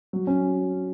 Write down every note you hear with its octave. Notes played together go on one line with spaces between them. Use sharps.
F#3
C#4